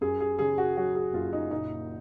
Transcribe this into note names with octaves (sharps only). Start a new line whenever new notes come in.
F#2 G#4
G#4
C#3 G#4
F#4
F#3 F#4
G#4
F#1 F4
D#4
A#2 D#4